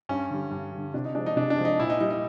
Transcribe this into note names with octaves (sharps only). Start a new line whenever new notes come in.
G2 C#4
D3 G3
G2
D3 G3
C3 D4
D#4
F3 G#3 D4
D#4
C3 D4
D4
F3 G#3
D#4
A#2 E4
D#4
G3 D#4
D#4